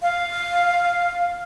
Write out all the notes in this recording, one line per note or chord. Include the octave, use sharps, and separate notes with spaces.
F5